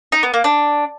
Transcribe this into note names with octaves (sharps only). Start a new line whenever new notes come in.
D#4
B3
A#3
D4